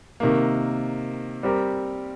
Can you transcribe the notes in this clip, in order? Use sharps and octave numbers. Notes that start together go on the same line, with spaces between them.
C3 D#3 A#3
G3 C4 G4 A#4